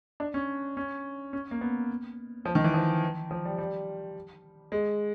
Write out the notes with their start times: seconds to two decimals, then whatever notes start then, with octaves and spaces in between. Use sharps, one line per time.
0.20 D4
0.34 C#4
0.77 C#4
1.33 C#4
1.51 A#3
1.61 B3
2.45 F3
2.55 D#3
2.64 E3
2.74 F3
3.31 F3
3.45 G3
3.58 G3
4.72 G#3